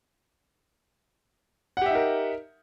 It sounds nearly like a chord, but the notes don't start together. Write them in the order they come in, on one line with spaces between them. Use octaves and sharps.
F#5 G4 E5 D#4 A#4